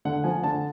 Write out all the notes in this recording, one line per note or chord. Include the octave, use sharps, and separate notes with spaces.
D3 F#5
F3 G#5
D3 A5